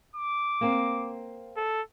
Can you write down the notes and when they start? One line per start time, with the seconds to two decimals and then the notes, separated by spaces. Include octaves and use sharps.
0.15 D6
0.61 A#3 C4
1.57 A4